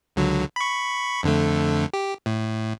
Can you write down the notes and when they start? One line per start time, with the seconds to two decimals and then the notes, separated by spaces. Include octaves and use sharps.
0.16 C#2 D3 F#3
0.56 B5 C#6
1.23 F2 D3 A3
1.93 G4
2.26 A2